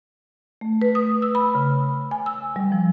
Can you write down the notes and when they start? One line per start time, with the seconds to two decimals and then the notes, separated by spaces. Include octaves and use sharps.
0.61 A3
0.82 B4
0.95 D#6
1.22 E6
1.35 B5
1.55 C#3
2.11 G#5
2.26 E6
2.56 G3
2.72 F3